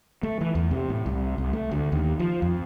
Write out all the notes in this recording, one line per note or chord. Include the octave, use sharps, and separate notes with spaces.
A3
E3
E2
C3
A2
C2
C2
A3
D2
D#2
F3
F2